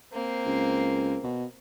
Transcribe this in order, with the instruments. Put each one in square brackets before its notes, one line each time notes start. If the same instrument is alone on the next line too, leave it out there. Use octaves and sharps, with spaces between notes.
[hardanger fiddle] A#3 C4
[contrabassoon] C#2
B2